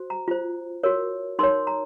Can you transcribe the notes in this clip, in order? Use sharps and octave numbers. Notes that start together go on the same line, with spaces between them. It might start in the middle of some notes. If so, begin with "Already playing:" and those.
Already playing: F#4 C5
A#5
F4 C5
F#4 A#4 C#5
D#4 A#4 C#5 C6
A#5